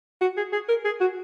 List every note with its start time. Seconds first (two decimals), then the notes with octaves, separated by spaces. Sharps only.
0.21 F#4
0.37 G#4
0.53 G#4
0.69 A#4
0.85 G#4
1.00 F#4